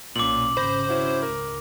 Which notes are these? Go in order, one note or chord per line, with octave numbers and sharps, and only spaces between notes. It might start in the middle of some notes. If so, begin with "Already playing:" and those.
B1 A#2 C#4 D6 F#7
G#1 C#3 C5 B5 G6 A#6
C#4 E4 F#4
C#2 A#4